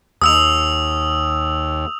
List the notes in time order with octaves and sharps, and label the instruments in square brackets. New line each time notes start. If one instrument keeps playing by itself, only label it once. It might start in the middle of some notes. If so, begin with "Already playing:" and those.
[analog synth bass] D#2 [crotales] D#6 E6 F7